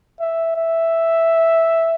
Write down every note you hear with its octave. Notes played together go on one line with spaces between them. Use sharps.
E5
E5